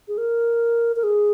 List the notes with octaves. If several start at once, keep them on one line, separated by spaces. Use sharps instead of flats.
G#4
A#4
A#4
G#4